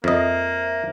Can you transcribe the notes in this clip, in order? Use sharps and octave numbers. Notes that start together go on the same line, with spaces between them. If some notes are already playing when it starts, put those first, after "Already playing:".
F2 A#3 C5 D#5 E5